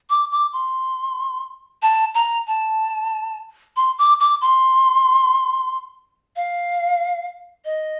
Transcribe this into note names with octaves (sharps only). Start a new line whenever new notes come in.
D6
D6
C6
A5
A#5
A5
C6
D6
D6
C6
F5
D#5